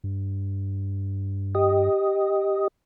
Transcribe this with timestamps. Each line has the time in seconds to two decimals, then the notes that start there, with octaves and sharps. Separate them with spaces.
0.04 G2
1.55 G4 D#5